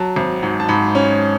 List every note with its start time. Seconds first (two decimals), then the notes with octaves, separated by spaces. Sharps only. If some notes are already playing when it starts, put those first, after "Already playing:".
Already playing: F#3 A5
0.16 G#1
0.43 G#2
0.60 A5
0.69 G#2 B5
0.95 C#4